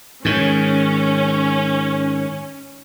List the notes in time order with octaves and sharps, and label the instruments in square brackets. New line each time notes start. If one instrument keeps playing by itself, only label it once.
[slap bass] G#2 D#3 [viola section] C#4